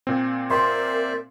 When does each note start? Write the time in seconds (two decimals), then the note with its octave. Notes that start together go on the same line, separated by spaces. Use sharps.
0.07 A#2 C4
0.50 A#4 C5 D5 E5 C6